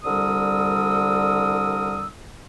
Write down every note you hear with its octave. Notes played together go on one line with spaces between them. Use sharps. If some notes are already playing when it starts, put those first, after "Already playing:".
C2 D3 G3 A#4 D#6 E6